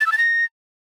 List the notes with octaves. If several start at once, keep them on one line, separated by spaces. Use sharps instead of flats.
A6
E6
A6
A#6